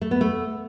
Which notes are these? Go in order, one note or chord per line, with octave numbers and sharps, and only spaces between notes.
A3
B3
A3